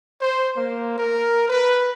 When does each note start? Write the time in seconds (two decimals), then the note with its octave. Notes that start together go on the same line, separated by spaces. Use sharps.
0.20 C5
0.56 A#3
0.98 A#4
1.48 B4